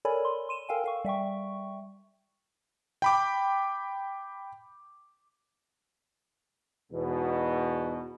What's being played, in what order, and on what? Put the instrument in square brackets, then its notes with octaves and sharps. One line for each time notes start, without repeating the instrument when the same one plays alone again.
[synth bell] A4 A#4 C#5 D5 G#5 B5
C6
C6 D#7 E7
A4 A#4 F5 G5 G#5
A4 F5 C#6
G3 E5 G5 C#6
[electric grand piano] G5 B5 D6
[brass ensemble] E2 G#2 B2